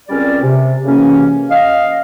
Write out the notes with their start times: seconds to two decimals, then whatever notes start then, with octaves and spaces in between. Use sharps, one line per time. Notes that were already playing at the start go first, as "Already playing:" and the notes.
0.09 C#2 G3 C4 C#4 A#4 D5
0.42 C3
0.85 F#2 C#3 E3 A#3 C#4
1.51 D#5 F5